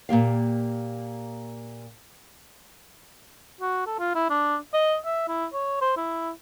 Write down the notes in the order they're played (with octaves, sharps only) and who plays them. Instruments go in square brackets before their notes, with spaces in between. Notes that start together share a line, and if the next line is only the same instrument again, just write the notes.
[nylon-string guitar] A#2 A#3 G4 F5
[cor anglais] F#4
A4
F4
E4
D4
D#5
E5
E4
C#5
C5
E4